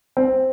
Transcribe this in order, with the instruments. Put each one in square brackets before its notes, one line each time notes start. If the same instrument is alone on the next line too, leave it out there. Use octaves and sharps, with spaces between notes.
[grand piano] C4